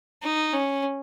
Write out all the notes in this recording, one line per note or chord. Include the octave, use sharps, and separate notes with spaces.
D#4
C#4